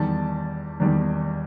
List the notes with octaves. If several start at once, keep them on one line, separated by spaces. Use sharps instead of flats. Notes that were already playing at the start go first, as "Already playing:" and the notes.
Already playing: E2 D#3 G3 A5
E2 D#3 G3